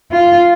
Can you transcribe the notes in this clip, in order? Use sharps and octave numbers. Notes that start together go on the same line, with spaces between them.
F4